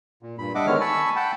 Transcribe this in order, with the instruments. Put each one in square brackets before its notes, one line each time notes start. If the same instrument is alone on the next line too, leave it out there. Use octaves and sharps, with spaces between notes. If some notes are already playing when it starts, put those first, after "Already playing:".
[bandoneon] A#2
G2 A#2 B5
G3 D4 D#5 E5 F#5 D6
D3 D#3 G#3 B3 C#5 F6
G#5 A5 B5 C#6 E6
F#5 G5 A5 B5